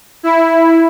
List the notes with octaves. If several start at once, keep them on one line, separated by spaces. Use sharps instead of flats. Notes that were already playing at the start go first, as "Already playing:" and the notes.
E4